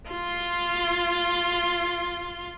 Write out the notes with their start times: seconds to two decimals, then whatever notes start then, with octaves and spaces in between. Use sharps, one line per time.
0.10 F4 C6